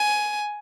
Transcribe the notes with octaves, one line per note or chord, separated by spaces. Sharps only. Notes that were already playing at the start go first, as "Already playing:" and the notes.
Already playing: G#5